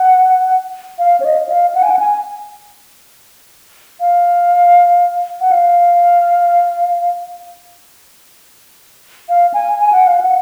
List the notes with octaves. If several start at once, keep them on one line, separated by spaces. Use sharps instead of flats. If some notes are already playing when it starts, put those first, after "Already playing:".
Already playing: F#5
F5
C#5
D#5
F5
F#5
G#5
F#5
G#5
F5
F#5
F5
F5
G#5
G#5
F#5
F5
F#5